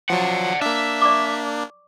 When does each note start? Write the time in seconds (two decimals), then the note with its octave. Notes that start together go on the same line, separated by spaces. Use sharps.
0.10 F3 F#3 D5 F#5
0.62 A#3 D4 E5
1.01 D5 C#6 D6